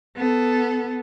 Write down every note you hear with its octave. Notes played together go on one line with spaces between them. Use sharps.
B3 A4